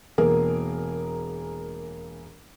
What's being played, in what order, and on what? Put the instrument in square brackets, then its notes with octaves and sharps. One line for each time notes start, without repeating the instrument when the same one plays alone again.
[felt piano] E1 A#3 G#4 A#4